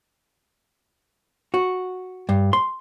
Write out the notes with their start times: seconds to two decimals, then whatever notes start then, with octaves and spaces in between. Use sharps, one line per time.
1.54 F#4
2.29 G2
2.53 C6